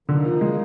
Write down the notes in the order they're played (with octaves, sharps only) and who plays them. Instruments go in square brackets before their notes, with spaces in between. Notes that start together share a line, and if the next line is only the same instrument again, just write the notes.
[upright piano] D3 [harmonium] D#3 A#3 D#4
[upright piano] F3
G#3